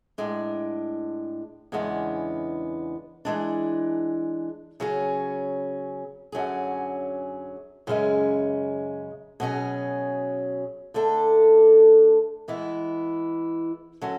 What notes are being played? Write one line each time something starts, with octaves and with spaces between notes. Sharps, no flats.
A2 G#3 D4
E2 C#3 G#3 B3 D4
E3 G#3 D4
C#3 F#3 C#4 G#4
F#2 D3 F#3 C#4 G#4
F#2 C#3 G#3 C#4 G#4
B2 F#3 C#4 G#4
D3 A3 D4 A4
E3 G#3 B3 E4
D3 F#3 C#4